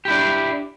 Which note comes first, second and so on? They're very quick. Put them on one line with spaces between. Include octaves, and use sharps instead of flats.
G4 E4 D4